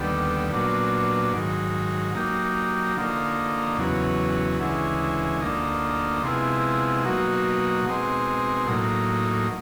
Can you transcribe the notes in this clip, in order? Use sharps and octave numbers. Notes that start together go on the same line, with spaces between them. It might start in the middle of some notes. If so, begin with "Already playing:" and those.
Already playing: D#2 D3 G3 B3
A#2 F#3 B3 D4
G#2 D#3 F#3
F#3 A#3 D#4 G4
D3 F3 A#3 D#4
E2 C#3 F#3 B3
D2 C#3 E3 G#3
D2 D3 F3 A#3 D#4
C3 F3 G#3 B3 E4
B2 F#3 A#3 D#4 F#4
B2 G#3 C4 D#4
A2 F#3 A#3 D#4